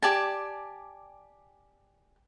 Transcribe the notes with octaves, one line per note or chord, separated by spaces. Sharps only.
G4 D5 G#5 A5